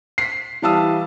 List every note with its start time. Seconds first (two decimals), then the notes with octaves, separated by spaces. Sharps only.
0.18 B6 C7
0.62 E3 G3 F5 A5 D#6 E6